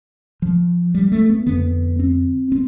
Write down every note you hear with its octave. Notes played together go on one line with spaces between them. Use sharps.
F3
G3
A3
B3
F2 D3 B3
C4
C4